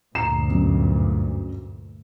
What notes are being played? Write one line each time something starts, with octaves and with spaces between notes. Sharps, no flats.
D2 G2 A#2 A#5 C7 E7
F#2 B2